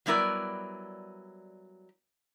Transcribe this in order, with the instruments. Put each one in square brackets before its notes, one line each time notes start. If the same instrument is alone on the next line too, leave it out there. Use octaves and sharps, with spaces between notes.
[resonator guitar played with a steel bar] F#3 G3 B3 E4 A#4 D5